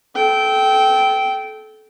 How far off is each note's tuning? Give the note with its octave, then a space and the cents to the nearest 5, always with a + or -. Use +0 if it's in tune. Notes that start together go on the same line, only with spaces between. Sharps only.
A4 -25 G5 -15